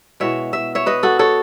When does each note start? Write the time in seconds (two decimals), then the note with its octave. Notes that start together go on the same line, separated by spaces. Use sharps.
0.20 B2 G#3 B3 E4 C#5 E5
0.53 E5
0.75 C#5 E5
0.86 B4 D#5
1.03 F#4 A4
1.19 A4 C#5